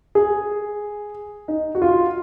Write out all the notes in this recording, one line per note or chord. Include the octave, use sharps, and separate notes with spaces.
G#4
D#4
F#4
F4